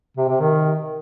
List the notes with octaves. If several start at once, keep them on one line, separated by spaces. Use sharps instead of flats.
C3
C3
D#3